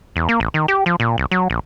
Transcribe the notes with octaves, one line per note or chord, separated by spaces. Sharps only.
E2
A#3
A1
D#3
G4
F3
A#2
C2
F#3
A#1